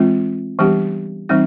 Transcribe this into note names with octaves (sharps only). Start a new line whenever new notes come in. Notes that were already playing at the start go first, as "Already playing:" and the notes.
Already playing: E3 G#3 C4 F4
E3 G3 B3 D4 G4
E3 G3 C4 D#4